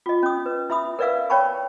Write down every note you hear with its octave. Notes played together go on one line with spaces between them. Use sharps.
F4 D#5
C#4 D#6
B4
E4 E5 B5 D#6
A#4 B4 D5 E5 F5 E6
C#5 D5 G5 A5 B5 C#6